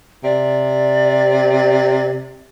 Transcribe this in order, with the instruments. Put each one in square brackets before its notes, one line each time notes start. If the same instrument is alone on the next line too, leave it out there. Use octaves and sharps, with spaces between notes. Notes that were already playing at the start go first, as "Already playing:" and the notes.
[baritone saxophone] C3 [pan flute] D5